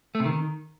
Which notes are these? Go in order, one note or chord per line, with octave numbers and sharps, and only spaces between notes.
A3
C3
D#3